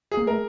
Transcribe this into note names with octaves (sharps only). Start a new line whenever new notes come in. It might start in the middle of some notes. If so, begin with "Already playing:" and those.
G#4
A#3
A3 A#4